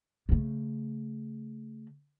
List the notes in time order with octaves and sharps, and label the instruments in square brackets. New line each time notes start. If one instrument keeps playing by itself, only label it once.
[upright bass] C#3 A3